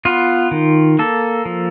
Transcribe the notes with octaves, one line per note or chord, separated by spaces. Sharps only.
B3 F4
D#3
A#3 A4
F3